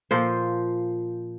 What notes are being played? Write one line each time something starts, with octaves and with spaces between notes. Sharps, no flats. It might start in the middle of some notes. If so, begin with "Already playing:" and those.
A#2 F3 C5